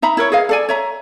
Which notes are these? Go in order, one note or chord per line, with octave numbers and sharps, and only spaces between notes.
D#4 E5 A#5 B5
E4 A#4 C#5
G#4 B4 D#5 F5
A4 D5 G#5
C#5 E5 A#5